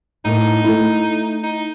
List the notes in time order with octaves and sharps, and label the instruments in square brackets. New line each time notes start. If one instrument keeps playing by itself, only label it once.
[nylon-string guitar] A2 A#3 [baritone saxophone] D#4
[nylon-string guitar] A3 E4
[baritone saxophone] D#4